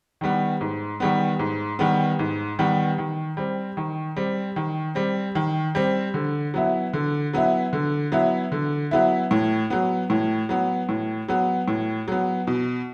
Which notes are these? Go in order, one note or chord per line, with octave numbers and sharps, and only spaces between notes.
D#3 G3 B3
G#2
D#3 G3 B3
G#2
D#3 G3 B3
G#2
D#3 G3 B3
D#3
G3 C4
D#3
G3 C4
D#3
G3 C4
D#3
G3 C4
D3
F#3 B3 E4
D3
F#3 B3 E4
D3
F#3 B3 E4
D3
F#3 B3 E4
A2
F#3 B3
A2
F#3 B3
A2
F#3 B3
A2
F#3 B3
B2